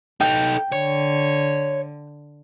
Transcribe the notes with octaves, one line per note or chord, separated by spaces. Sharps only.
D#4 A4 G5
D3 C#5